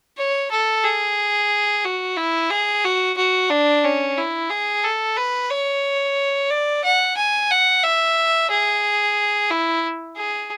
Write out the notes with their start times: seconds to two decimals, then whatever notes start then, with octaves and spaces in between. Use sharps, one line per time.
0.18 C#5
0.51 A4
0.84 G#4
1.84 F#4
2.17 E4
2.50 G#4
2.84 F#4
3.17 F#4
3.50 D4
3.84 C#4
4.18 E4
4.50 G#4
4.84 A4
5.17 B4
5.50 C#5
6.50 D5
6.84 F#5
7.17 G#5
7.51 F#5
7.84 E5
8.50 G#4
9.50 E4
10.16 G#4